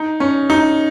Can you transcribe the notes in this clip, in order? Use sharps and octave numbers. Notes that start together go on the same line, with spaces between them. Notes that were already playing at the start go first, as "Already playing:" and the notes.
Already playing: D#4
C#4
D#4